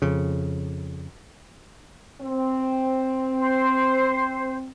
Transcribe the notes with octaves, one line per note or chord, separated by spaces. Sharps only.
F2 C#3
C4
C5